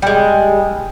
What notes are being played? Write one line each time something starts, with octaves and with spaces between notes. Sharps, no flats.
G3 G#3